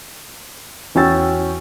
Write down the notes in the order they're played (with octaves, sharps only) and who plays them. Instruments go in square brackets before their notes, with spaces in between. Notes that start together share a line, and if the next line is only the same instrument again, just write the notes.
[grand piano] E2 C#4 F#4 G5 E6 A6